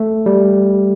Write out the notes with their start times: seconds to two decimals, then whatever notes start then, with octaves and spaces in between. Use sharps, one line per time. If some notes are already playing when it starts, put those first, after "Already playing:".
Already playing: A3
0.26 G3